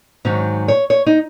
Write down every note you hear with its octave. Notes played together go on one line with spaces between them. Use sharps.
G#2 D#3 F#3 C#4
C#5
C#5
D#4